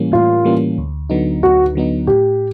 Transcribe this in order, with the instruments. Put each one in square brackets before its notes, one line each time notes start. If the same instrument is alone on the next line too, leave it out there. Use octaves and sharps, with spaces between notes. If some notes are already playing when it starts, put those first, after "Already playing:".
Already playing: [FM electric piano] A2 E3 G3 A#3 C#4
[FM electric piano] A2 [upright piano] F4
[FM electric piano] E3 G3 A#3 C#4
D2
D3 F#3 B3 D#4
[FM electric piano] D2 [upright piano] F#4
[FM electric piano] D3 F#3 B3 D#4
[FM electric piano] A2 [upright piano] G4